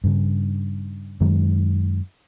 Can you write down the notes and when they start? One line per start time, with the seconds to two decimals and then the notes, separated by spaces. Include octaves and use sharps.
0.04 G2 C#3
1.21 F#2 D#3 G#3